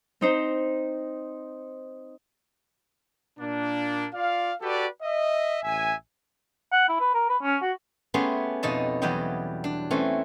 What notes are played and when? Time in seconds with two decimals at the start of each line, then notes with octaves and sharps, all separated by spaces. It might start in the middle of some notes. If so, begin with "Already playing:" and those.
0.21 C4 D#4 C5
3.39 A#2 A#3 D4
4.14 F4 D5 F5
4.62 F#4 G4 A4 B4 D5
5.03 D#5 E5
5.63 A1 E5 G#5
6.72 F#5
6.89 E4
7.00 B4
7.14 A#4
7.29 B4
7.42 C#4
7.62 F#4
8.14 A3 B3 C#4 G4 G#4 C6
8.63 F2 B2 D#4 D#5 A5
9.02 E2 F#3 G3 G4 D#5 G5
9.64 D4
9.91 E3 A3 C4 C#4